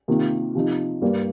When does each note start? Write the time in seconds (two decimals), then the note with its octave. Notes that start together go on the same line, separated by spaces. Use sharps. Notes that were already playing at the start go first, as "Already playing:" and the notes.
0.08 C3 D#3 A#3 F4
0.55 C3 F3 D#4
1.02 G2 G3 A#3